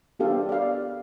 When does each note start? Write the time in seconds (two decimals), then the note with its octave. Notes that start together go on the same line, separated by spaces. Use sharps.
0.19 B3 D4 G4 A4 F5
0.49 D5 F5